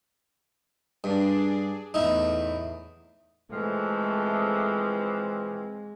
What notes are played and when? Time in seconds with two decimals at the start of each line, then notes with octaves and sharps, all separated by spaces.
1.04 G2 D4 G#4
1.94 E2 A2 D#4 E4
3.52 E3 F3 G#3 A3 C4